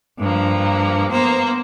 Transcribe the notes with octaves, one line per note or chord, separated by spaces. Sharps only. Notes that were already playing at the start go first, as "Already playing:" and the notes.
G2 F3 A#3
A#3 B3 C5